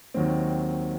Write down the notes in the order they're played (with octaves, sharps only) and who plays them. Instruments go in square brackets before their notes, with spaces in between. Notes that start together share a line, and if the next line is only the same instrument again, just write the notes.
[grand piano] D#2 D#3 F#3 C4